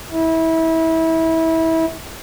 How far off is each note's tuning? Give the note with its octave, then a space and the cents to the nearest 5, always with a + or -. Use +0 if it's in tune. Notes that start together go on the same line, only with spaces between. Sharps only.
E4 -25